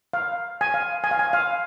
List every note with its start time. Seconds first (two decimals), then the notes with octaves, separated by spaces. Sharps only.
0.13 F5
0.61 G#5
0.74 F5
1.04 G#5
1.11 F5
1.19 G#5
1.33 F5